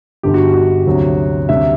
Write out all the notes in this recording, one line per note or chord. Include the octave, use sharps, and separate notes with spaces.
G1 G2 D3 G4
F#4
F#4
D2 C3 F#3
D2 C3 G3 E5